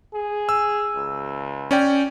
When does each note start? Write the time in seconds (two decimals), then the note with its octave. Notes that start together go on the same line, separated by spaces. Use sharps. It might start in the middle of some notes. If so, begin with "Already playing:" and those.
0.14 G#4
0.49 E6
0.96 C#2
1.71 C#4 D5 G5